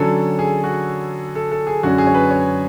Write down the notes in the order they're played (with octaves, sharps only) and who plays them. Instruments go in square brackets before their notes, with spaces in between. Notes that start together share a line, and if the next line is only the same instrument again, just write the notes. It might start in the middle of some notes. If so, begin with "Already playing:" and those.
Already playing: [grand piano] D3 F#3 C#4 A4
G#4
F#4
A4
A4
G#4
F#2 D3 G#3 C#4 F#4
G#4
C#5
B4
C#5